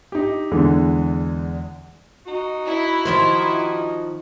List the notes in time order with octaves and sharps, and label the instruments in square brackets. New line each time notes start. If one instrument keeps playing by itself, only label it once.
[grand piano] D#4 G4
E2 D3 E3 G#3
[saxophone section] D#4 F#4
[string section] E4
[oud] D#3 F3 C5